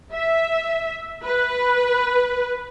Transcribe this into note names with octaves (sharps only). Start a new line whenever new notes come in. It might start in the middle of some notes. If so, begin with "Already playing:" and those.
E5
B4